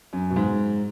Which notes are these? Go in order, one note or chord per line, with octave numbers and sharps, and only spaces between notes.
F#2
B2
G#2